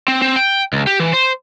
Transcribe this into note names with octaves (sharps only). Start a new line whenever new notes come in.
C4
C4
G5
C#2
G4
E3
C5